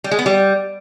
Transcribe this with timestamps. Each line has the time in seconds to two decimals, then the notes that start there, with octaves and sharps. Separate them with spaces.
0.04 G3
0.11 G#3
0.19 B3
0.26 G3